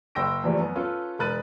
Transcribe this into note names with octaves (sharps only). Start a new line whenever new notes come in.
F#1 G5 E6 A#6 D7
E2 E3 F3 G3 A3
F#2 B3
C#4 F4 A4 B4
E1 A#4 B5 F#6 A6 D#7